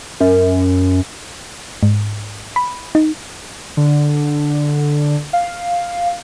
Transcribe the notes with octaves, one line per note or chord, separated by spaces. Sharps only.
F#2
G#2
B5
D#4
D3
F5